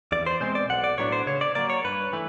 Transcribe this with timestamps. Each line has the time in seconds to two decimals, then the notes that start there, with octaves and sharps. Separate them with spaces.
0.12 E2 D5
0.26 C5
0.40 B2 G#3 C4 C5
0.55 D5
0.69 B1 F#5
0.84 D5
0.98 A2 F#3 B3 D4 C#5
1.12 C5
1.27 C#3 C#5
1.41 D5
1.55 F#3 A#3 D5
1.70 C#5
1.84 G2 B4
2.13 E3 A3